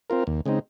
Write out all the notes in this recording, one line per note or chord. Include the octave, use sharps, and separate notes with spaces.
C4 F4 A#4
D#2
C#3 G#3 C4 D#4